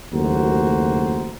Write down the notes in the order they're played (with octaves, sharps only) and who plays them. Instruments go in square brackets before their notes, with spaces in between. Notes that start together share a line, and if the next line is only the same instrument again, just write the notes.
[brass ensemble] F#1 D#2 A3 F#4 C5 A#5